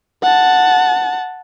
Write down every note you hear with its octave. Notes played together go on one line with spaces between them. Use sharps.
F#5 A5